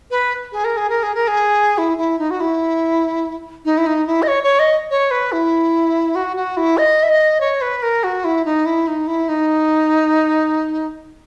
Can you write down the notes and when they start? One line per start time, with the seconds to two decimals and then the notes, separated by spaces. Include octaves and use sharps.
0.11 B4
0.52 G#4
0.64 A#4
0.77 G#4
0.90 A#4
1.03 G#4
1.15 A#4
1.27 G#4
1.78 E4
1.98 E4
2.19 D#4
2.30 F#4
2.40 E4
3.65 D#4
3.78 E4
3.86 D#4
4.07 E4
4.22 D#5
4.28 C#5
4.43 C#5
4.59 D#5
4.90 C#5
5.11 B4
5.32 E4
6.15 F#4
6.37 F#4
6.57 E4
6.78 D#5
7.03 E5
7.09 D#5
7.40 C#5
7.61 B4
7.83 A#4
8.03 F#4
8.24 E4
8.45 D#4
8.66 E4
8.87 D#4
9.07 E4
9.29 D#4